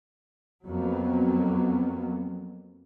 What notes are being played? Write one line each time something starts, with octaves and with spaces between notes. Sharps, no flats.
F2 F#3 A#3 B3